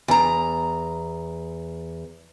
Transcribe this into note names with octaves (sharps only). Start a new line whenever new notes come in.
E2 A#5